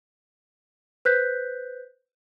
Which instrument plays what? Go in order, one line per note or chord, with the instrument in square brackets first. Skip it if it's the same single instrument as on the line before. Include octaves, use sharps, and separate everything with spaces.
[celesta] B4 C5 F#6 G6 B6